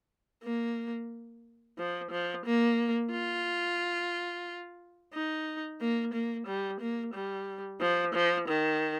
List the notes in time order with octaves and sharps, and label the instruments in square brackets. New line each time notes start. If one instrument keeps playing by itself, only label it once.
[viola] A#3
F3
F3
A#3
F4
D#4
A#3
A#3
G3
A#3
G3
F3
F3
D#3